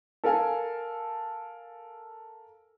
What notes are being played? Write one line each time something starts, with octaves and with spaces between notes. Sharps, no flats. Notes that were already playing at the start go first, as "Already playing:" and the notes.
A4 A#4 F5 G#5